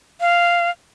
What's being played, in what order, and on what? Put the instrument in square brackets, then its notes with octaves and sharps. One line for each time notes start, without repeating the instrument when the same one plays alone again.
[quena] F5